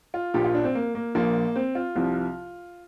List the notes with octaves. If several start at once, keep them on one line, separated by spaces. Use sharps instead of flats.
F4
A#1 A#2 F3 G4
F4
D4
C4
A#3
A#3
A#1 A#2 F3 A#3
C4
F4
C2 C3 F3